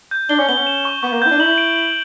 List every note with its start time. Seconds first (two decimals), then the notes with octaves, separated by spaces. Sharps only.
0.11 G6
0.29 D4 G7
0.39 C#4
0.48 B3 G7
0.58 C#4
0.67 E7
0.85 C#6
1.03 B3 C#6
1.13 A#3
1.22 B3 E4 G6
1.31 D4
1.40 E4 F#7
1.58 D7
1.76 F#7